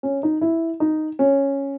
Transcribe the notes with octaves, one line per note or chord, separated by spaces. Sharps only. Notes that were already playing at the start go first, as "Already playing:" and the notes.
C#4
D#4
E4
D#4
C#4